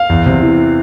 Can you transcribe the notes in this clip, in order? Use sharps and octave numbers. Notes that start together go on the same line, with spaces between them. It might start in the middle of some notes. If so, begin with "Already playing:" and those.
Already playing: F5
E2
C3
E3